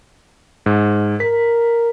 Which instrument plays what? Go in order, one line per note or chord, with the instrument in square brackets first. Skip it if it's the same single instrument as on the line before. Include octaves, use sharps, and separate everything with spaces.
[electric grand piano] G#2
[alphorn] A#4 [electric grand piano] B6